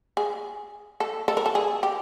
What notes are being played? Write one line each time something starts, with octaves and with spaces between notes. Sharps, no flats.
G#4
A4
A4
A#4
A4
G#4
G4